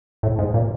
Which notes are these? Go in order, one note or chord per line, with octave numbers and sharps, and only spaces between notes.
A2
G#2
A#2